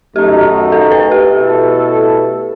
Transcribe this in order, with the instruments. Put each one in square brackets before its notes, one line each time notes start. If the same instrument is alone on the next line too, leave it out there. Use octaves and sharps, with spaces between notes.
[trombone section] F#2 D#3 A3 D#4 F#4 [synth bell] G4
[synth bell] A4
B4
G4
[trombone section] B2 A3 E4 A4